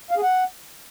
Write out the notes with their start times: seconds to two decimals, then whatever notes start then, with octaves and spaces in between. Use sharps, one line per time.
0.11 F5
0.17 G#4
0.23 F#5